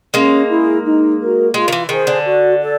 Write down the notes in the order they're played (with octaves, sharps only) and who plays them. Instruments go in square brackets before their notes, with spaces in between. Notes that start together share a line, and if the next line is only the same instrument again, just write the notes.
[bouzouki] G#3 A#3 [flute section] C#4
[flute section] E4 G#4
D#4
F#4 A#4
[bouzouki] G#3 [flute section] F4
[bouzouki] D#3
E3
[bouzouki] D#3 [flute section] G#4 C5
[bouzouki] D3
[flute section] F#4
A4 D5